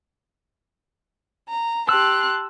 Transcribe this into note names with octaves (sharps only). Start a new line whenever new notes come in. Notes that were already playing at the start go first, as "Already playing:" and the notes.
A#5
G4 A5 C6 E6 F#6